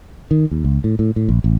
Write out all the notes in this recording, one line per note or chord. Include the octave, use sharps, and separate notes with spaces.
D#3
D#2
C#2
A2
A2
A2
A#1
A1